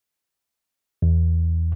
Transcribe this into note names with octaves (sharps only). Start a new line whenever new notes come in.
E2